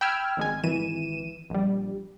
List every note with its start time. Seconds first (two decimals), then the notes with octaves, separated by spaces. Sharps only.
0.01 G5 B5 E6 F6 G#6
0.37 G#1 G#3 G#5
0.64 G#1 E3 D#7 E7
1.50 A#1 G3